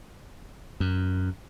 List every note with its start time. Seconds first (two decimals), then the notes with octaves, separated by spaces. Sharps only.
0.80 F#2